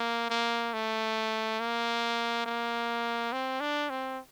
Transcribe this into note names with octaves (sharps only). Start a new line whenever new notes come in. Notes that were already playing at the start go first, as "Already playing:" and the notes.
Already playing: A#3
A#3
A3
A#3
A#3
C4
D4
C4